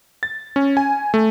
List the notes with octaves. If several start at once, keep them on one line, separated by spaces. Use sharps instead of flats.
A6
C#4
G#5
A3